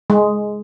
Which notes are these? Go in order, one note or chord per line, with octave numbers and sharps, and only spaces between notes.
G#3